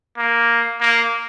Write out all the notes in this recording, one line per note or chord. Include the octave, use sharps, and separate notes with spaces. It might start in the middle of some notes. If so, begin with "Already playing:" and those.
A#3
A#3